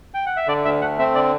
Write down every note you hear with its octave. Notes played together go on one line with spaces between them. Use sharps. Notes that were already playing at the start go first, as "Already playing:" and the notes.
G5
F#5
E5
D3 D5
D2 E5
A3 F#5
C4 E5
D3 D5